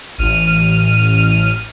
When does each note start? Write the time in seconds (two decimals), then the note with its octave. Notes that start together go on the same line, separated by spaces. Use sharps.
0.18 A1 F6 D#7